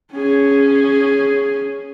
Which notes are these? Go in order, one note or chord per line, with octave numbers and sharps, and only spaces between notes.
C#4 G#4